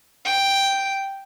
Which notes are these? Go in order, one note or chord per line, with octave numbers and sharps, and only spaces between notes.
G5